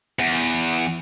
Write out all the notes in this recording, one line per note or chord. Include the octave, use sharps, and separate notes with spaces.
E2